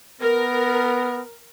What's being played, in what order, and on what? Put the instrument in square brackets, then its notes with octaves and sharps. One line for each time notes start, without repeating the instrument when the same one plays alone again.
[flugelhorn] B3 [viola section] A#4